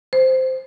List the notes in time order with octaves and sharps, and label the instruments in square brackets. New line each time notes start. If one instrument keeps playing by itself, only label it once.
[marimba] C5